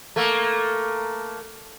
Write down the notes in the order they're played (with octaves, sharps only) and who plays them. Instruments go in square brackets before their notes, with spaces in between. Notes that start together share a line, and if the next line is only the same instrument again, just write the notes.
[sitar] A3 A#3